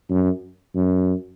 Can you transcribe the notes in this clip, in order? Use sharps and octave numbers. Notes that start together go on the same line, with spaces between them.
F#2
F#2